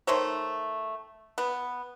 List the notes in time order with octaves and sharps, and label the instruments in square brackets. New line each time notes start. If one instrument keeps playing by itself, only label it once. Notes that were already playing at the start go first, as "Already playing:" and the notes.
[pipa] D#3 A3 C5 C#5
B3